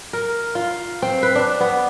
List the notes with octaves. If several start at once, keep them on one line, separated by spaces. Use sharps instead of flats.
A#4
F4
C4
B4
D4
B3